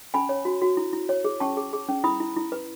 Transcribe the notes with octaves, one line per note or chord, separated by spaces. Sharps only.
C#4 G#5 B5
C#5
F#4
F#4
E4
E4
C#5
G#4
C#4 A5 C#6
G#4
G#4
C#4
E4 B5 D#6
E4
E4
B4